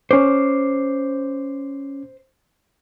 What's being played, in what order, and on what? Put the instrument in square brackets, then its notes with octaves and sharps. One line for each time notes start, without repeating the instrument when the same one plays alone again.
[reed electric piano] C#4 D6 [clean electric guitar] C5